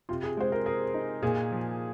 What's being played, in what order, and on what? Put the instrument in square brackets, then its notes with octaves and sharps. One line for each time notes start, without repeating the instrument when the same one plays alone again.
[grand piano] C3 [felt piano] F4
[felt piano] G#4
[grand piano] G#3 [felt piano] C5
[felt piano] A#4
[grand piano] G#4 [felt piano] A#4
[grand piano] D#4
[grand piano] A#2 [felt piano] G#4
[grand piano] F3